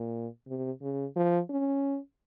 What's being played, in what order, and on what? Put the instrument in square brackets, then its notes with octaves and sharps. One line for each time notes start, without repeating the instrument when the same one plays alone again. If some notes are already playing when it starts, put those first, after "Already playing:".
Already playing: [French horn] A#2
C3
C#3
F3
C#4